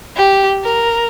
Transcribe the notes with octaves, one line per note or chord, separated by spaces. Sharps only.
G4
A#4